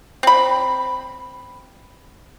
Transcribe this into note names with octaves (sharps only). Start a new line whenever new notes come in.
C4 B5